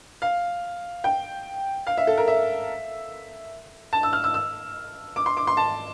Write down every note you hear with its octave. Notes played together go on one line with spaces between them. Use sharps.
F5
G5
F5
E5
A4
A#4
E5
A5
E6
F6
E6
E6
D6
C6
D6
C6
A5